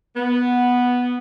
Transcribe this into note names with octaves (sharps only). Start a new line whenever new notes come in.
B3